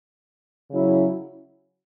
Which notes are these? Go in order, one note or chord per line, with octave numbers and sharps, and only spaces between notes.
C#3 F#3 C#4 E4